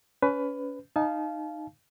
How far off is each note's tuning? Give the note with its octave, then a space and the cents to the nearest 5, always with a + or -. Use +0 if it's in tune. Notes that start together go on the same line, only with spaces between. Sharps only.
C#4 +30 B4 +15
D#4 -15 F5 -10 A5 -40